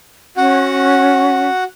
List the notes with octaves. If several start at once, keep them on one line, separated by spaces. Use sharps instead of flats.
C#4 F#4 F#5